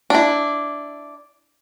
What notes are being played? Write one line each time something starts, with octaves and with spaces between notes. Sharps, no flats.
D4 E4